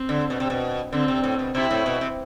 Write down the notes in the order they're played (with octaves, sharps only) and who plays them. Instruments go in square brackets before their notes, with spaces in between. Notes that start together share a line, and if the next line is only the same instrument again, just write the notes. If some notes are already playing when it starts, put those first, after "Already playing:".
Already playing: [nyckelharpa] C4
[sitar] D3
B2
C3
B2
[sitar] D3 [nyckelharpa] C4
[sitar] C3
A2
B2
[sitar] C3 [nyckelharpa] E4
[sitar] A2
B2
C3